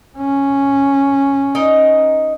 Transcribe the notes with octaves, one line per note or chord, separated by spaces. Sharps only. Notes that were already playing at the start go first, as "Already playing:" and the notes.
C#4
D#4 A#4 D#5